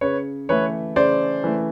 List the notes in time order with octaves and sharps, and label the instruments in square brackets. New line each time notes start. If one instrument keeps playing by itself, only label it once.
[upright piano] C#3 [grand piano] B4 C#5
[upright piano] E3 A3 [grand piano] B4 C#5
[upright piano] C#3 [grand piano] C5 D5
[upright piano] E3 A3